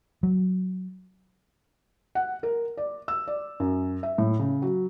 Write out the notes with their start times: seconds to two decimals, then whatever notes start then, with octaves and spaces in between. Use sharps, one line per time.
0.23 F#3
2.15 F#5
2.43 A#4
2.77 D5
3.08 E6
3.28 D5
3.60 F#2
4.03 E5
4.18 A2
4.39 C#3
4.62 F#3